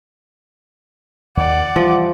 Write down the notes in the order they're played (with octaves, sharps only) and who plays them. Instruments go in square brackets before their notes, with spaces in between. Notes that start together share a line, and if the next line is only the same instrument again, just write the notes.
[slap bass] D#2 [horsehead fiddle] D5 F#5
[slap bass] E3 G3 [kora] F3